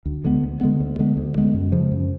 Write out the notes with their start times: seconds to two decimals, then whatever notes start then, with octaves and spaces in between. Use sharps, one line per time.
0.05 D2
0.24 D3 G#3 B3
0.43 D2
0.61 D3 G#3 B3
0.80 D2
0.99 D3 G#3 B3
1.17 D2
1.35 D3 G#3 B3
1.54 F#2
1.72 C#3 F3
1.91 F#2